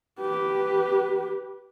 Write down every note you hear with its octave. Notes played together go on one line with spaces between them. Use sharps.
G4 B4